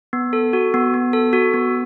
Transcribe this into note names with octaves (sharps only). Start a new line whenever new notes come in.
B3
A4
F#4
B3
B3
A4
F#4
B3